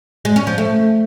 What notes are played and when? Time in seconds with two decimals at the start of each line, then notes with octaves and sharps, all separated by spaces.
0.25 G#3
0.36 C#4
0.47 F3
0.58 A3